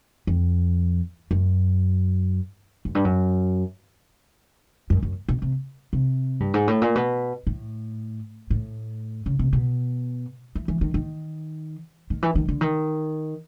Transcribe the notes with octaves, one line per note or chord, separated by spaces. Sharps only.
F2
F#2
F#2
G2
F#2
F#2
F#2
B2
C3
C3
G2
G#2
A2
A#2
B2
A2
A2
C#3
C3
B2
E3
E3
D#3
D#3
D#3
E3
D#3
D3
D#3